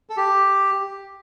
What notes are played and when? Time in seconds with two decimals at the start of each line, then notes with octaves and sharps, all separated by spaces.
0.09 A4
0.17 G4